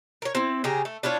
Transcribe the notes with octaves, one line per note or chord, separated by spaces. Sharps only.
A#4 C#5
C4 E4
C#3 G4 G#4 A#5
A3
D4 E4 F4 C#5